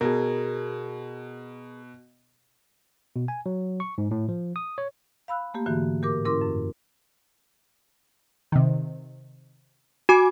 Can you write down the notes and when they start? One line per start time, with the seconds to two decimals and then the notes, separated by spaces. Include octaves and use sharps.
0.01 B2 G#4 A#4
3.16 B2
3.28 G#5
3.46 F#3
3.80 C#6
3.98 G#2
4.11 A2
4.29 F3
4.56 D#6
4.78 C#5
5.28 F5 B5 E6 F#6
5.54 A3 A#3 G4
5.66 G#2 D3 E3 A#3 F#4 G4
6.02 A2 G4 A#4 D6
6.25 G#2 C#4 E4 A#4 C6 D6
6.41 F#2
8.52 C3 D#3
10.09 F#4 G#5 D6